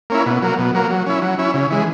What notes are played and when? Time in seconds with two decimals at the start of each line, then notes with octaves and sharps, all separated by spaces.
0.10 A#3 C#4 E4
0.26 B2
0.42 F#3 A#3
0.58 B2
0.74 F#3 A#3
0.90 F#3
1.06 C#4 E4
1.22 F#3
1.38 C#4 E4
1.54 C#3
1.70 E3 G#3